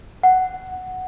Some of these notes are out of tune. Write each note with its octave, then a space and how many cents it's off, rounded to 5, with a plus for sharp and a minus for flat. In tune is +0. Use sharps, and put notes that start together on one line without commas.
F#5 +5